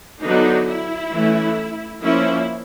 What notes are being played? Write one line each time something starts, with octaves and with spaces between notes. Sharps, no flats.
D3 F#3 B3 D4 D#4
E4
E3 A3 C#4
F3 A#3 C#4 E4